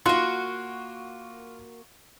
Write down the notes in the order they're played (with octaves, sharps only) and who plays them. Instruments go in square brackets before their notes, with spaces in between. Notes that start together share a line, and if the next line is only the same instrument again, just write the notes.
[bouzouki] A#3 F#4 [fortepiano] F4 C6